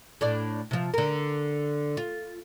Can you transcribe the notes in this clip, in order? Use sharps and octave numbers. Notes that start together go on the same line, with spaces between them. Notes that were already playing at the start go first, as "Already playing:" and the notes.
A2 D4 D5
C3 F3
D3 A#4
F4